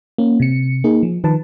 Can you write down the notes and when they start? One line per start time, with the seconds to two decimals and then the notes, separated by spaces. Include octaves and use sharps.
0.18 A#3 C#4
0.40 C3 C#7
0.84 A#3 D#4 G#4
1.03 F3
1.24 D#3 F3 B4 A5